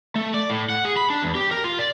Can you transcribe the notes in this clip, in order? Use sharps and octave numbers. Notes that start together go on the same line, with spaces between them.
A3
D5
A2
F#5
G#4
B5
D4
E2
G4
A#4
F4
D5